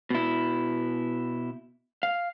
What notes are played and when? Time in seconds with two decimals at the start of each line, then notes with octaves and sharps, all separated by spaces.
0.10 B2 E4
2.03 F5